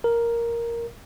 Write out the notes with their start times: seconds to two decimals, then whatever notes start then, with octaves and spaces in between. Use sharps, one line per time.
0.04 A#4